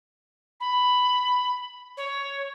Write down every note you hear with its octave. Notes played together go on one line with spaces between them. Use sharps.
B5
C#5